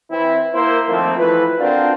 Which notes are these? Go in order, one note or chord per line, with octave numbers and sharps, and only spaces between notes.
E3 C4 E4
A#3 E4 C5
D#3 F3 A3 A#3 C4
E3 F3 A3 B4
C4 D4 F4 F#4 A4 A#4